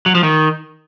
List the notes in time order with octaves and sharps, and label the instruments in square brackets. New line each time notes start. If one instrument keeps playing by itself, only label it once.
[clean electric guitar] F#3
F3
D#3